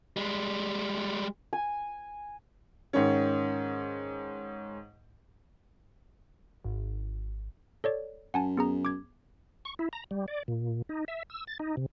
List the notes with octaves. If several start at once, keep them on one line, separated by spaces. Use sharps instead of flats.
G3 G#3
G#5
G#2 D#3 C#4
G#1
A4 C#5 D5
F#2 F#5 G#5 A5
B3 G#4 A#5
D6 G#6
C#6
E4
A#5
G3
D5
A#2
D#4
E5
E6
A6
D#4
C3